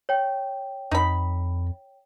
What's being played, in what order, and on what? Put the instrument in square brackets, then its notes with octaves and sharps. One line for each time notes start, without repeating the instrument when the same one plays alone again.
[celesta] C#5 G5
[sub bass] F2 [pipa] D#4 B5